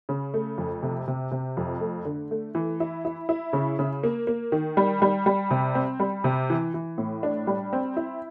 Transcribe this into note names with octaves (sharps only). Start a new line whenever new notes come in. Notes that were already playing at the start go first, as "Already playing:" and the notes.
C#3
A3
F2
C3
C3
C3
F2
A3
D3
A3
E3
E4
E4
E4
C#3
C#3
A#3
A#3
D#3
G3
G3
G3
C3
C4
G3
C3
E3
E3
A2
D4
G3
C4
E4